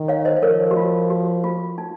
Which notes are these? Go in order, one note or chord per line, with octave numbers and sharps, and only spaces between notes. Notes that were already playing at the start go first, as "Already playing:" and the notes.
Already playing: D#3
C#5 F5
C5 D#5
C5
F3 A#4 C#5
F#4
F4
F#4
F4
D#4